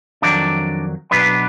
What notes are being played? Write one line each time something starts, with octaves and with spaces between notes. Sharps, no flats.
F2 D#3 F#3 D4 D5
B2 F#3 B3 D4 B4